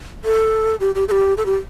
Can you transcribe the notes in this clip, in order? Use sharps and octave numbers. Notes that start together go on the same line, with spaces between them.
A4
G4
G4
A4
G4
A4
G4